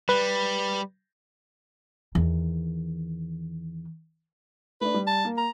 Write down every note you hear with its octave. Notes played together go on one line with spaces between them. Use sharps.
G3 B4
E2 D#3
A3 D4 B4
G3
A5
A#3
A#5